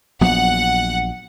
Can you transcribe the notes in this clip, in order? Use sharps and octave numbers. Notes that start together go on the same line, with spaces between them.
A#1 F#3 B3 F#5